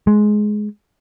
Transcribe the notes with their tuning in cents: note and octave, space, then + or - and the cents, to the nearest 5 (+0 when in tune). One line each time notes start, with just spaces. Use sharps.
G#3 +15